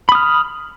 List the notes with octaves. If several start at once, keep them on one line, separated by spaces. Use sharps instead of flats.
B5 D#6 F6